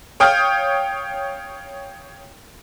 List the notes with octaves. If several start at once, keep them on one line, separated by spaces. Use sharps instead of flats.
C#5 F5 G5 D#6 F6 G6